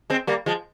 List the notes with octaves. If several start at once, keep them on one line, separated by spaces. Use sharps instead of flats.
G#3 C4
G3 A#3
F3 G#3